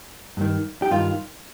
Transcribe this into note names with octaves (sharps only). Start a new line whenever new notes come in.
G2 D#3
G4
G2 D#3 F4